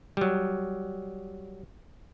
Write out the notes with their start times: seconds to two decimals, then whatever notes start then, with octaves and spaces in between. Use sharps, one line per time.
0.17 F#3 G3